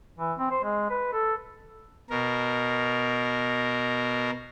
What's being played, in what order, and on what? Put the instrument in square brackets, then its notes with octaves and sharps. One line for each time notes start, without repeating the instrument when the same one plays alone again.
[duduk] E3
C4
C5
G#3
B4
A4
[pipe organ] B2 A#4